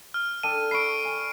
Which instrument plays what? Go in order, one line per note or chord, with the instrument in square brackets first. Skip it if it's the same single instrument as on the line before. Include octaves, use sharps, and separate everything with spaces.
[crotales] F6
[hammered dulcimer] D4 A4 G5 [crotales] D#7
[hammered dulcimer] B5 C#6 [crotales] C7 D7
[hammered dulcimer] G#5